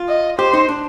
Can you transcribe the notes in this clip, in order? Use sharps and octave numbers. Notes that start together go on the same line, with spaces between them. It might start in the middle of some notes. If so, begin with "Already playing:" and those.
Already playing: F4
D#5
G4 C5
D#4
D4